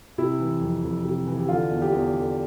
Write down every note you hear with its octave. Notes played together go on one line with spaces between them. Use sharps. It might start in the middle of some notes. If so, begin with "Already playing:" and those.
C3 E4
E3
F2
F2
C3
E3
G4
D3 F4
E2
G4
E2
D3